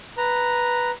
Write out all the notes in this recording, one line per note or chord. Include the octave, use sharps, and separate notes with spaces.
B4 A#5